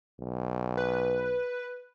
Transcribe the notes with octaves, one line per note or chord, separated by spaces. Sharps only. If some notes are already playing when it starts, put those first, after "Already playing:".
B1
B4